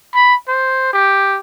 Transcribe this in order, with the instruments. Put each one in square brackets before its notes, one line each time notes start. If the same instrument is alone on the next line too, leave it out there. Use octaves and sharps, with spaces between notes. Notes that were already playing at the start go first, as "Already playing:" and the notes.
[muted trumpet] B5
C5
G4